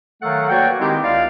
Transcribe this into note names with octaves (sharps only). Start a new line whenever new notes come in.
D#3 F#3 A3 A4 F5 F#5
A#3 F#4 B4 C#5 D5 G5
D#3 G#3 C4 D#4 E4 G4
C#2 G#3 D5 F5